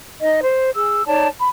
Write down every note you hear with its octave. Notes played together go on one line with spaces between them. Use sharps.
D#4 D#5
C5
G#4 E6
D#4 C#5 D5 A5
B5